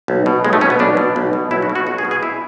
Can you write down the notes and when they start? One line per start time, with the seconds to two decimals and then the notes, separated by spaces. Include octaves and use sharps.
0.08 B1
0.26 B2
0.45 B1 G#3
0.53 A3
0.61 B2 C#4
0.70 B3
0.79 B1 D4
0.97 B2
1.16 B1
1.33 B2
1.51 B1 E4
1.62 F#4
1.69 B2
1.75 F#4
1.87 B1 F#4
1.98 G#4
2.05 B2
2.11 G#4
2.23 E4